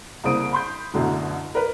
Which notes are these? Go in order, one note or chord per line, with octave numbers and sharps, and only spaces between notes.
C2 C#3 A#3 C5 D#6 D7
B5 C6 G6
A1 F#2 B2 D3 F#3
A#4 B4